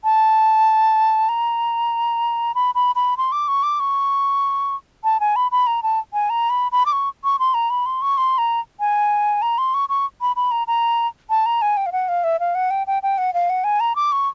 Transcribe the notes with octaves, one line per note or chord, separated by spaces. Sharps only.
A5
A#5
B5
B5
B5
C6
D6
C#6
D6
C#6
A5
G#5
B5
B5
A#5
A5
G#5
A#5
B5
B5
D6
C#6
C#6
C6
A#5
B5
C6
C#6
C6
A#5
G#5
A#5
C6
C#6
C#6
B5
B5
A#5
A#5
A5
A#5
G#5
G5
F5
F#5
F5
E5
F5
F#5
G5
G5
G5
F#5
F5
F#5
G#5
A#5
D6
C#6